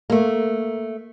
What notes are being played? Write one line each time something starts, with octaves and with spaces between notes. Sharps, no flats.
A3 A#3